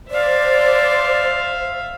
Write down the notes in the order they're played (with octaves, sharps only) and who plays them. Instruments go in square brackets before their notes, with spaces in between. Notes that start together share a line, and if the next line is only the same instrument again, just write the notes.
[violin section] C5 [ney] D5 [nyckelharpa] E5 F5